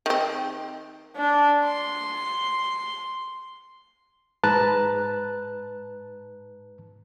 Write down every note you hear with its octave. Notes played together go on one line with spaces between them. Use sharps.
D#3 C4
D4
C6
G#2 B4 A5 A#5 F#6